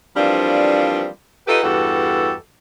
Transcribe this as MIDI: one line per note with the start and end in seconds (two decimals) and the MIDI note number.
0.16 1.07 52
0.16 1.07 53
0.16 1.07 55
0.16 1.07 58
0.16 1.07 60
0.16 1.07 62
1.47 1.60 63
1.47 1.60 65
1.47 1.60 67
1.47 1.60 69
1.47 1.60 71
1.63 2.33 40
1.63 2.33 43
1.63 2.33 52
1.63 2.33 66
1.63 2.33 67
1.63 2.33 69